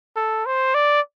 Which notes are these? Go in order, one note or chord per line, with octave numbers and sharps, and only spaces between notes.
A4
C5
D5